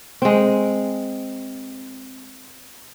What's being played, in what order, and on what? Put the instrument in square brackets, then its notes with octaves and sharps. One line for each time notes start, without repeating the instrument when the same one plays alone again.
[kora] G#3 C4